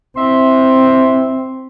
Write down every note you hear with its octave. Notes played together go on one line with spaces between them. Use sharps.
C4 E4 E5 C6